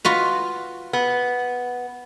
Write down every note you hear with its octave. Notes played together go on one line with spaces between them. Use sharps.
F4 F#4 B4
B3